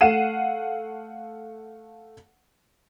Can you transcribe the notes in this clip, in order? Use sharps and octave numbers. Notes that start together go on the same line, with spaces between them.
A3 F5 F#5 C7 D#7 E7